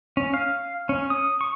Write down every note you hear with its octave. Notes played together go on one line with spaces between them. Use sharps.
C#4
F5
C#4
D#6
C#6